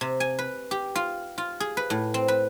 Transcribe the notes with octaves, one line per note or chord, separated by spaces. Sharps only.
C3
G#5
B4
G4
F4
F4
G#4
B4
A2
C4
B4